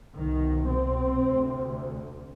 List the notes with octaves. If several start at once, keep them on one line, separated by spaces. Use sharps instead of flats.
C2 B2 D#3
C4
D2 C3